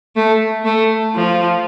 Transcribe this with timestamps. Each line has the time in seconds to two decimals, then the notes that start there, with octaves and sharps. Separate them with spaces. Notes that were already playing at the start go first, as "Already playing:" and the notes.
0.16 A3
0.65 A3
1.15 F3